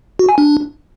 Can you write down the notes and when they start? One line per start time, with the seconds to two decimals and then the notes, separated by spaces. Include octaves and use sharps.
0.19 F#4
0.29 G#5
0.38 D4